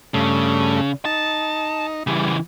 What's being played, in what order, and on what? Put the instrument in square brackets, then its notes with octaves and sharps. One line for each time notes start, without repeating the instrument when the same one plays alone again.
[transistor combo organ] G2 A3 [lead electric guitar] C#3
[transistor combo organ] D#4 [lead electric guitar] A5
[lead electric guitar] C#3 E3 [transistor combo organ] G3